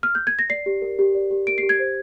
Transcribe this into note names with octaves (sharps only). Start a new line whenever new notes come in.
F6
G6
G#6
A#6
D5 C7
G4
A#4
G4
D5
G4
A#4 D7
C7
G4
G#6
C5